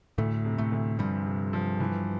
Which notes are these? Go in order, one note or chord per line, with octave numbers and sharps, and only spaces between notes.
D2 A2 A3
C3
A2 A3
D2
G2 F3 G3
C3
F3
E3